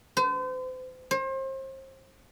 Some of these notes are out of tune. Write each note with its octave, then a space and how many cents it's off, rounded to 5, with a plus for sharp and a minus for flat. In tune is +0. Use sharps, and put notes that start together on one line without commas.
C5 -40
C5 +35